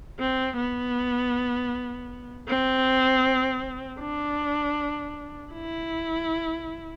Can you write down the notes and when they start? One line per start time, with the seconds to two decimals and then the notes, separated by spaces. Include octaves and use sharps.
0.19 C4
0.57 B3
2.48 C4
4.00 D4
5.53 E4